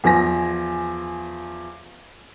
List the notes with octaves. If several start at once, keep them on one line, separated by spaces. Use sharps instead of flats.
E2 F3 G#5 A#6